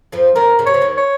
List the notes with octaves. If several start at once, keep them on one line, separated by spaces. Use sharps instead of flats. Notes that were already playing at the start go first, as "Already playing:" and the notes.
F2 F3
D#2 D#3 A#4
C#3
C3 C#5
C#3
D#2 D#3
C#5